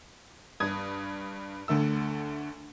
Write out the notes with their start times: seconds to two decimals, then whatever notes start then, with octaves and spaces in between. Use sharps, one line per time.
0.60 G2 D#6 G#6
1.68 D2 D3 A3 E6